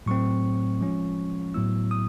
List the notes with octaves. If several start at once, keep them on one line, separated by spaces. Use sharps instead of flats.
A2 F#3 A3 C4 C#6
F3 G#3 C#4 F4
A2 F#3 B3 E4 E6
D#6